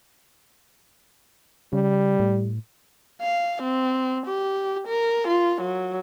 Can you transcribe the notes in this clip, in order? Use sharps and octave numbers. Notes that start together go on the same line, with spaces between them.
C#3 G3
A2
F5
C4
G4
A#4
F4
F#3